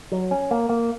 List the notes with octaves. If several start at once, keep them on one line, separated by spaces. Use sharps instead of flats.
F#3
C#4
A#3
A#3